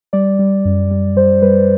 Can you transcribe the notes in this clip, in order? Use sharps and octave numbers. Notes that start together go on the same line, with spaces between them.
G3 D5
G3
F#2
G3
G3 C5
G3 B4